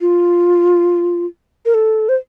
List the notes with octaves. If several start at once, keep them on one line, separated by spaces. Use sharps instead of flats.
F4
A#4
A4
C5